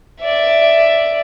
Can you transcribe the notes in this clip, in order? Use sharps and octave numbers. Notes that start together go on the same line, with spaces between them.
D5 E5